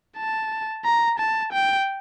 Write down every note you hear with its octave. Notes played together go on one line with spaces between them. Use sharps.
A5
A#5
A5
G5